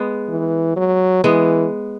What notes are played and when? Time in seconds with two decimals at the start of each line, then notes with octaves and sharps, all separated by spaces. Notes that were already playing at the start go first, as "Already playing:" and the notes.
Already playing: G#3 B3
0.29 E3
0.77 F#3
1.24 E3 G#3 B3